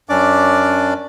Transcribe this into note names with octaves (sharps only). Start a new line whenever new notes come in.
F#2 C#4 D4 D5 D6